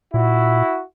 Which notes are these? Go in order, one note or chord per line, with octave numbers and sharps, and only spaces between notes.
A#2 E4 F#4